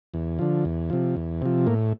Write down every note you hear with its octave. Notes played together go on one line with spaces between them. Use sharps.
E2
D3 F3
E2
C3 F3
E2
C3 F3
A2 A#3